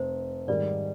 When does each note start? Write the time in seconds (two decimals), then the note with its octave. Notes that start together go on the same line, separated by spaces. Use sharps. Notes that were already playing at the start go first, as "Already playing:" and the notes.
Already playing: F1 C5
0.47 G#2 D#3 G3 D5